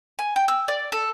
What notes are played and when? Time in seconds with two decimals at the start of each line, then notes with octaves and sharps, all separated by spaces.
0.19 G#5
0.36 G5
0.48 E6
0.68 D5
0.92 A4